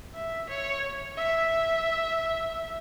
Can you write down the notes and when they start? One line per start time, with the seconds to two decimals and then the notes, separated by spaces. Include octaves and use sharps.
0.14 E5
0.49 C#5
1.17 E5